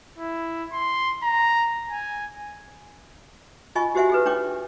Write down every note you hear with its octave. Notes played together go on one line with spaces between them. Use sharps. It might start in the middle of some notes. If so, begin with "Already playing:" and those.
E4
C6
A#5
G#5
F4 D#5 G#5 C#6
F#4 G4 C5 E5 F#5 G#5
G4 G#4 B4
D4 C#5 G5 D6